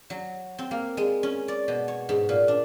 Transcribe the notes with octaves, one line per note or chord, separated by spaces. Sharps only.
F#3
C4
A#3
G#3
C#4
D5
B2
C#5
G#2
A#2
D4